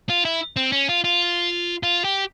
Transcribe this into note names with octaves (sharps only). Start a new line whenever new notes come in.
F4
E4
C4
C#4
F4
F4
F4
G4